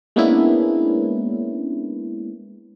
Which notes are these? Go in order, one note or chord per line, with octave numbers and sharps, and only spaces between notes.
G#3 A#3 B3 C#4 D4 E4